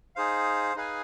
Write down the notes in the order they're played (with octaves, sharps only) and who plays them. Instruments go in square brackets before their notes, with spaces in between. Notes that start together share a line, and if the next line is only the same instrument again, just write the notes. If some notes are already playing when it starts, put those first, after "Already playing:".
[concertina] D#4 G#4 C5 F5
D#4 G#4 B4 F5 G#5